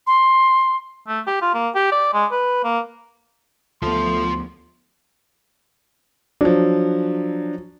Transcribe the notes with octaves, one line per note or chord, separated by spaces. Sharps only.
C6
A3
G4
F4
A#3
G4
D5
G#3
B4
A#3
D2 F3 A3 B3 F4 A5 C6
F3 F#3 D4